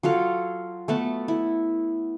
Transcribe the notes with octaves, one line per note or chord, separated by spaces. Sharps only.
F#3 F4 A4 F5
A3 B3 A5
E4